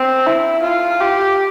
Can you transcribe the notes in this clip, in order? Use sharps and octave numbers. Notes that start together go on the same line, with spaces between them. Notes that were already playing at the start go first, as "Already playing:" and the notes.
Already playing: C4
E4
F4
G4